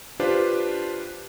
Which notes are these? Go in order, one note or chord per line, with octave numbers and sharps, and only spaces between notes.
D4 F4 G4 B4 C5